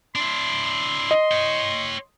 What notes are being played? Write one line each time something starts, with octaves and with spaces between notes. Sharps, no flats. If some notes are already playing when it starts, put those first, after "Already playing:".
D4 E4 C6
D#5
C#5 G5